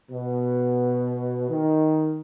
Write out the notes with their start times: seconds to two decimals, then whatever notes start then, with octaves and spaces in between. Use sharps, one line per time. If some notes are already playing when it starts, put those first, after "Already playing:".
0.10 B2
1.50 D#3